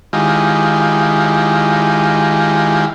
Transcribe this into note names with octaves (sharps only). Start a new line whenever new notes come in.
D#3 G#3 E4 F4 G4